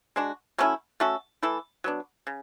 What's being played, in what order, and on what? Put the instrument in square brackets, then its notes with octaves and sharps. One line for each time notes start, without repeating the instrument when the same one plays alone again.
[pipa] G#3 D4 F#4
F#3 A3 C#4 E4
A3 C#4 F#4 A4
E3 A3 E4 A4
F#3 B3 D4
C#3